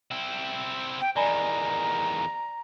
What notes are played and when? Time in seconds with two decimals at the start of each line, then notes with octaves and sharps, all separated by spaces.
0.11 C4 E4
1.01 G5
1.16 E2 D#3 D5 G#5 A#5 B5